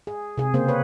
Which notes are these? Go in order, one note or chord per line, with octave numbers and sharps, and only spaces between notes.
G#4
C3 G#4
C#3 A#3 C4 G#4 C5
B4 C#5